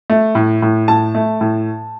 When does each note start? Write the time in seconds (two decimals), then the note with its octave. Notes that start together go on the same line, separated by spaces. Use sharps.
0.10 A3
0.35 A2
0.62 A2
0.88 A2 A5
1.15 A3
1.41 A2